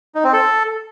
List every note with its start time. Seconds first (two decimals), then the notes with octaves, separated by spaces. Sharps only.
0.15 D#4
0.24 C4
0.33 A4